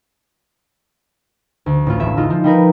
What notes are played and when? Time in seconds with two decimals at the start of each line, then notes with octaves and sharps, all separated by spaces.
1.66 D2
1.87 A1 F4
2.00 E1 A3 E5
2.17 G#3 D#4 F4
2.30 F3
2.44 G3 D#4 A#4 B4